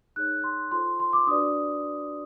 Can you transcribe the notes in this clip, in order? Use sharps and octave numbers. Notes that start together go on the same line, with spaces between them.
D#4 G#4 C#5 F#6
C6
F4 A4 C5 C6
C6
D6
D4 F#4 B4 D5 D#6